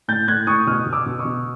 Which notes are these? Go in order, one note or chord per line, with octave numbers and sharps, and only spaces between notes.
A2 G6 A6
A2 F#6 G#6
A2 C#6 D#6
B2 D#6 F6
B2
D6 E6
B2
C#6 D#6
B2